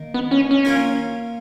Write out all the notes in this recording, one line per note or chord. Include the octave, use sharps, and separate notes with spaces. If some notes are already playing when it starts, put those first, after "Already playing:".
Already playing: D#3 A#3
B3
C#4
C#4
A#3 F4 A#4